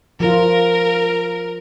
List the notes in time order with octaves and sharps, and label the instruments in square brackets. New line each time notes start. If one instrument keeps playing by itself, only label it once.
[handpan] F3 F4 [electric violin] A#4